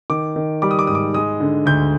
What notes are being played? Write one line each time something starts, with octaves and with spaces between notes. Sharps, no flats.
D#3 D6
D#3
G3 D6
D#6
D6
G#2 D#6
D6
G#3 D#6
D3
D2 G6